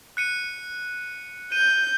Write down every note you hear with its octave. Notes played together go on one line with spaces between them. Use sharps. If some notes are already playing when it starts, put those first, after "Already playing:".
F#6 C#7 D#7
G6 D#7